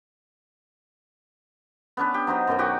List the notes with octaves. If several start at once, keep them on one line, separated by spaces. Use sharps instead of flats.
B3 C#4 D4 B4
G4
F#3 D#4 C5 D#5
F#2 B2 D#3 F#3
F#4 G4 D#5 G5